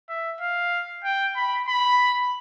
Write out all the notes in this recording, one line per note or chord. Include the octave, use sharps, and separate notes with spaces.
E5
F5
G5
B5
B5